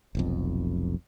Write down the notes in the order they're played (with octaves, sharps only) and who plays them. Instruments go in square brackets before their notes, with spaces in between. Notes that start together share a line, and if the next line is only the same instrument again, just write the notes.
[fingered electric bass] F1 B1 F2